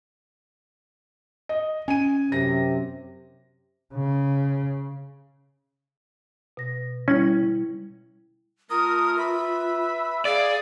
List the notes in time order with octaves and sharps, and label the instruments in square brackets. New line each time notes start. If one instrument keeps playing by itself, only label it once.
[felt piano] D#5
[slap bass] C#4 [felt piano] G#5 D#7
[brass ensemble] F#2 C3 [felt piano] A#6
[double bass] C#3
[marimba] B2 A#6
[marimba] G3 E4 [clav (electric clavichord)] C#4
[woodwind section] A3 A#4 [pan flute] F4 [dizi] D#6
[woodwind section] B4 E5 [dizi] B5
[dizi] G#4 [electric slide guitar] D5 [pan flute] F5